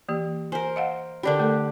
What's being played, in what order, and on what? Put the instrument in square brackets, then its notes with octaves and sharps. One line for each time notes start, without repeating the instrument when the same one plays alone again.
[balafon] E3 A#3 G4
[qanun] A#4 C5 [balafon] G#5
[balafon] D#5 F5 F#5
[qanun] D3 D4 G4 [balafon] A#4 D5 B5
[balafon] A3 A4